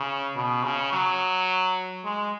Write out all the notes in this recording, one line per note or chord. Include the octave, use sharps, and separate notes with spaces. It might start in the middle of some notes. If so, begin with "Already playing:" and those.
Already playing: C#3
B2
C#3
F#3
G#3